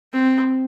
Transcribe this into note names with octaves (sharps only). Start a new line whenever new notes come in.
C4